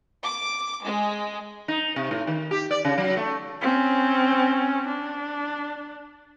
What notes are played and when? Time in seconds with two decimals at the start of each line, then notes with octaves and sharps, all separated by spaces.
0.23 D6
0.83 G#3
1.68 D#4
1.96 C3
2.11 A2
2.27 D#3
2.51 G4
2.71 D5
2.85 C#3
2.98 F#3
3.17 A3
3.62 C4 C#4
4.87 D4